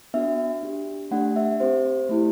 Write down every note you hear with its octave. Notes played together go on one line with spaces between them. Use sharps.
B3 D4 F#4 E5
D4 G4
A3 D4 G4 F#5
E5
C4 G4 C5
A3 E4 G4